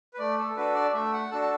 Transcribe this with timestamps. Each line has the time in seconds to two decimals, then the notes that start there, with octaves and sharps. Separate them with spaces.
0.14 B4
0.19 A3 D5
0.38 A4
0.56 D4 F#4 A4 B4
0.75 D5
0.94 A3 E5
1.13 F#5
1.31 D4 F#4 A4 A5
1.42 A5